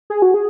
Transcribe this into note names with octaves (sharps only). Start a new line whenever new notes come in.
G#4
F#4
G#4